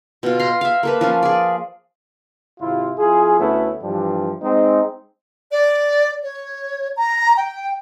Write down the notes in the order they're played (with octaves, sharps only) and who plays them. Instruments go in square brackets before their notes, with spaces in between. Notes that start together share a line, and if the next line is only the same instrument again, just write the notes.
[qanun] B2 F4
A#5 C6
E5 F5
A#3 A4 B4
F3 C#4 F4
G#4 D5
[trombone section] G#1 C3 E4 F4
F2 E4 F4 G#4
D2 A3 B3 C#4 E4 A4
G2 E3 F3 G3 D4 G4
G#3 C4 D#4
[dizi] D5
C#5
A#5
G5